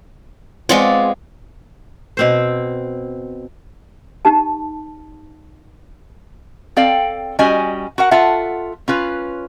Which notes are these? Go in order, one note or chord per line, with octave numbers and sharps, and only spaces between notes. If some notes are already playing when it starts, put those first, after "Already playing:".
G#3 B3 C4 F4 D5 C#6
B2 C4 C5
D#4 G4 A5
C4 A4 D5 F5 G5
G3 C#4 F#4 D#5 G#5
F#4 A#4 F#5
F4 A4 E5 F#5
C#4 F4 B4